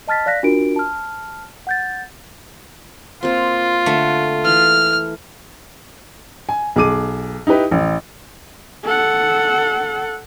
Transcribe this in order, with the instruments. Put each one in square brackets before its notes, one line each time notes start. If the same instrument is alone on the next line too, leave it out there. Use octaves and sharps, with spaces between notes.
[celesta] D#5 A5 F6 A6 B6
D5 F5 F#6 A#6 B6
D4 F4 F#4 A#4 D7
A5 F6
F#5 G6 A6
[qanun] A#3 C4 [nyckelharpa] F4
[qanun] D3 [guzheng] A3
[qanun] E3 [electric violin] F6
[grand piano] G#5
B1 G#4 D6 D#7
D#4 E4 G4 B4
A1
[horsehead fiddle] A4 F#5